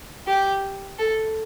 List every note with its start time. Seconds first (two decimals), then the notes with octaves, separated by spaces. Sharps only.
0.27 G4
0.98 A4